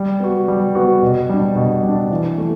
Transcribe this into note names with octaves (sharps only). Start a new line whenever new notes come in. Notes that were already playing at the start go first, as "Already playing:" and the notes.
Already playing: G3
B3 F#4
G3
B3 F#4
B2
G3 D4
B2
G3
D4
E3
A3